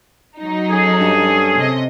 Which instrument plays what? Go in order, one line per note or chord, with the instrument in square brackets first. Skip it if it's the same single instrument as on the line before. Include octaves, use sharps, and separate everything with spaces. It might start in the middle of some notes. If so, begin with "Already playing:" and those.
[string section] F#3 D#4
[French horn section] C#4 A4 [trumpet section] G#4
[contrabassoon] G2
[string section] C3 D#5